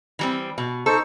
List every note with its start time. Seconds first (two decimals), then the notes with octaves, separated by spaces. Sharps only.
0.19 E3 G3 C4
0.58 B2
0.86 D#4 A4 C5 C#6